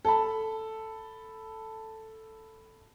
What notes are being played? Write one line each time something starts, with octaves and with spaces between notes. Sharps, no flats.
A4 A5 B5